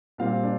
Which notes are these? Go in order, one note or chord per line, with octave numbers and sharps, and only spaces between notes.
A#2 G3 C4 F4 F5
D4